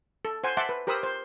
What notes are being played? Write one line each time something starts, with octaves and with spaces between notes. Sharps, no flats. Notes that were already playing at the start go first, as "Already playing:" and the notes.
A4
C5 F#5 G#5
E5 F#5 A5 C6 D6
B4
G4 A#4 C5 B5 D#6 E6
C5